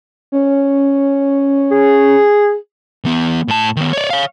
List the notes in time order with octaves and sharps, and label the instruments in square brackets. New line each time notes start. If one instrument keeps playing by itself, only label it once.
[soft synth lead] C#4
[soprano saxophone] G#4
[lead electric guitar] E3 B3
A2 A5
D#3 B3
C#5 D5
C#5 F5